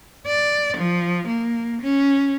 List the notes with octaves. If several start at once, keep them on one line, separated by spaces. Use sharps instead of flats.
D5
F3
A#3
C#4